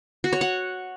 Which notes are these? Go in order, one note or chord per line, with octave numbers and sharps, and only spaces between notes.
F#4
C#5
F#5